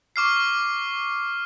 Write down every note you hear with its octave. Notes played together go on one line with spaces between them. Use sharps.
C#6 D6 F6 C7